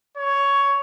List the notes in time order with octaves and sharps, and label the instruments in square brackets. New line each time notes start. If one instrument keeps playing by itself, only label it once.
[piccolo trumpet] C#5